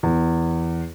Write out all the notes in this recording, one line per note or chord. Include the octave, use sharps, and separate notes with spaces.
E2